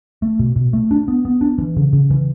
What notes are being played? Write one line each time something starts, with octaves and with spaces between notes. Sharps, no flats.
A3
B2
B2
A3
D4
B3
B3
D4
E3
C#3
C#3
E3